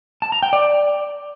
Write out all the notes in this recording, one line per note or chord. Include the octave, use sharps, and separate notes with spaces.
A5
A#5
G5
D5